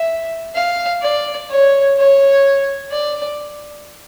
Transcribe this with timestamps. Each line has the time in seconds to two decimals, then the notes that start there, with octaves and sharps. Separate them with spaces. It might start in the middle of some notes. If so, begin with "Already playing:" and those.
Already playing: E5
0.55 F5
1.03 D5
1.50 C#5
1.98 C#5
2.92 D5